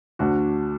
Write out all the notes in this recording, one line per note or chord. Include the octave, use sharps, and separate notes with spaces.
D2 D4 F#4